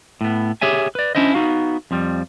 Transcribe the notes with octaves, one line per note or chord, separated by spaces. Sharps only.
A2 B3
G4 G#4 C#5 E5 G#5
B4 D5
C#4 D4 E4 C5 D#5
B3 D#4 F#4 F5
F2 F3 G3